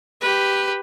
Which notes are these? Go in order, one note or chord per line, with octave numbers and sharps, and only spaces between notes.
G4 B4